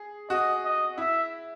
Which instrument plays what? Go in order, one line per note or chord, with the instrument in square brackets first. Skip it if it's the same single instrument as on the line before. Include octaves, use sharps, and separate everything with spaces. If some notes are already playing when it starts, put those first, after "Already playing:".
Already playing: [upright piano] G#4
[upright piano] F#4 [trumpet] D#5
[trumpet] D#5
[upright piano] E4 [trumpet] E5